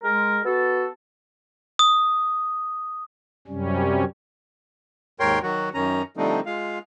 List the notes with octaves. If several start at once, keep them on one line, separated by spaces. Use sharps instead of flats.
G#3 A#4
B3 F#4 A4
D#6
F#2 C3 G3 C#4
D#2 G#2 A#4 C#5 G5 C6
D#3 F#3 F#4
F#2 D#3 C#4 A#5
D3 F3 G3 A3 C4 D#4
G#3 F4 F5